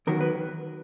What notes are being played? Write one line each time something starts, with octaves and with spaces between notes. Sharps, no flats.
E2 D#3 F#3 A#4
B4